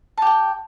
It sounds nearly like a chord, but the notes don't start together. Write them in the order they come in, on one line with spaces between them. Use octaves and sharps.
A5 G4 G5